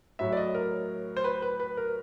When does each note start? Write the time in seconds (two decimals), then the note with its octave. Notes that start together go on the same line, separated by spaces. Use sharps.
0.19 A2 F#3 E5
0.32 D5
0.37 D#5
0.55 A#4
1.17 C5
1.24 B4
1.42 B4
1.60 B4
1.77 A#4